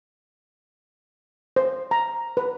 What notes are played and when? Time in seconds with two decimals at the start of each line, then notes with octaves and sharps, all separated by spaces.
1.56 C5
1.91 A#5
2.37 B4